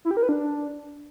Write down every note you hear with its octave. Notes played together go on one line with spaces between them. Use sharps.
E4
G4
A#4
B4
D4